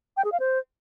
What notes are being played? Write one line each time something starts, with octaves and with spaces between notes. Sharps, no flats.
G5
G#4
F5
C5